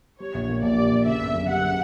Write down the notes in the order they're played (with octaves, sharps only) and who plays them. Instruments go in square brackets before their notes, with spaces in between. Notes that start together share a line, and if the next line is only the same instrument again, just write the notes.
[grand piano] G3 [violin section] C#5
[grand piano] A#1
A#2
[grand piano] A#1 [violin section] D5
[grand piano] G3
A#1
[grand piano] C#3 [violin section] E5
[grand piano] G1
F#2
[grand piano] G3 [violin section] F#5
[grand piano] C#3